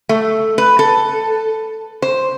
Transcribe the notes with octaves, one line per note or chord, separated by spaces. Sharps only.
A3
B4
A4
C5